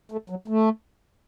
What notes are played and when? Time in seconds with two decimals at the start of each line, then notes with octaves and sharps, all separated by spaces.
0.12 A3
0.30 F#3
0.48 A3